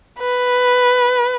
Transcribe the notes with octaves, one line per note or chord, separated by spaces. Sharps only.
B4